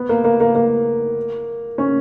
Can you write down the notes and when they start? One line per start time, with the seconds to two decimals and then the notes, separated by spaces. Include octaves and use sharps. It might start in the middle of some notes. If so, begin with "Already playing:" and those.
Already playing: B3
0.09 A#3
0.24 A#3
0.40 A#3
0.55 A#3
1.78 C#4